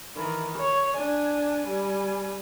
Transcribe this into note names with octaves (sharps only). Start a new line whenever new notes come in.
D#3 E3
C#5
D4 G#5
G3 G#5